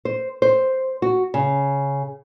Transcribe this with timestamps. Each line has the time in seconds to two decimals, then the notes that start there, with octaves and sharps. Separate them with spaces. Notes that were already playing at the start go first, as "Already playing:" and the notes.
0.05 C5
0.42 C5
1.02 F#4
1.34 C#3